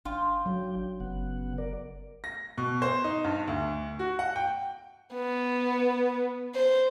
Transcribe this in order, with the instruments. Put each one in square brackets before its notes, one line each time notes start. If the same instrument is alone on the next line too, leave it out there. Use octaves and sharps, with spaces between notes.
[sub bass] G#1 [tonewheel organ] D4 G5 [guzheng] F4
[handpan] F#3
[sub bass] F#1 [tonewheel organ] C#3 B3 F#5
[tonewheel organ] A#4 D5
[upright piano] A#6
B2
C5
D#4
G2
D2
F#4
F#5
G5
[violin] B3
C5